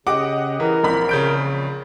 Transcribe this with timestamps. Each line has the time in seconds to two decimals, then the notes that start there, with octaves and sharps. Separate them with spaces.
0.07 C#3 G4 D#5 F#5 D6
0.60 E3 A#4
0.83 A#1 C4 B5
1.09 C#3 G6 D7